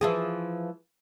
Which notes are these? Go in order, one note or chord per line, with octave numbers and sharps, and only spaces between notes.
E3 F3 G#4